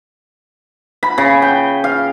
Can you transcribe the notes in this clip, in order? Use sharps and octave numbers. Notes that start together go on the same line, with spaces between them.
B5
C#3
G5
F5